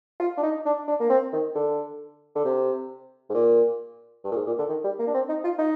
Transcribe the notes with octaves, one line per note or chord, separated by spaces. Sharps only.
F4
D4
D#4
D4
D4
A#3
C4
D#3
D3
D3
C3
G#2
A#2
G2
A#2
G#2
A#2
D3
D#3
G3
A#3
D4
C4
D#4
F4
D#4